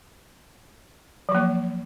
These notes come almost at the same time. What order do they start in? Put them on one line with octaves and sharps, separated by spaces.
F#3 F3 A#3